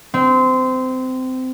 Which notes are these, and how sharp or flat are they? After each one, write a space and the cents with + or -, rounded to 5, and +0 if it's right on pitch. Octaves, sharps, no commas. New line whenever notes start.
C4 -20